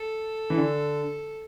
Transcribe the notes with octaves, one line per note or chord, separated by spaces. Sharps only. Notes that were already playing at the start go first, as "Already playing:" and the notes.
Already playing: A4
E3
D3